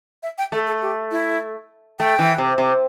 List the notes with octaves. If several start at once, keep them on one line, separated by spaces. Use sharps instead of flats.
E5
G5
A3 A4
A4
G4
E4
A3 G5
E3
C3
C3